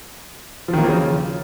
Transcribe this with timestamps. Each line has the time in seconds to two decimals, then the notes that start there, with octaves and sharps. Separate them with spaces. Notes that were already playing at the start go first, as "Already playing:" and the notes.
0.68 F3
0.73 D#3
0.79 A#3
0.84 F3
0.89 C#3